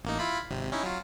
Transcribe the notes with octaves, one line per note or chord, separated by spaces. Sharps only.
A1 A#3 D#4
E4 F4 B5
G#1 C3
C#4 D#4 E4
F#3 F4